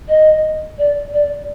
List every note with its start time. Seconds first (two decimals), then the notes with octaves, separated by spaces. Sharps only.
0.08 D#5
0.78 D5
1.13 D5